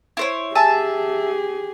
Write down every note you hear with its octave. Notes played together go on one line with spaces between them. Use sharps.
E4 C5 C#5
G4 G#4 E5 G#5 A5